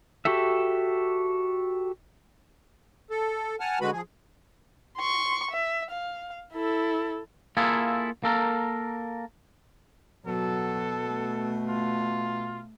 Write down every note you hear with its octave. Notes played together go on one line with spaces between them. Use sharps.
F#4 G4 A4 E5
A4
F#5 G#5 A5 F6
D3 G#3 F#4 B4 B5
F3 G#4
C6 C#6
E5
F5
E4 A4
A#3 E4 F4 G#4 A4
A#3 A4 A#4
B2 F#3 A4
A3
F4